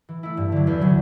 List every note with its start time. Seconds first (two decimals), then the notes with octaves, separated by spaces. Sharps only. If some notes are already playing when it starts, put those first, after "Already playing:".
0.09 E3
0.23 A3 E4
0.37 G2
0.52 D3 F#3
0.67 E2
0.81 C#3 F#3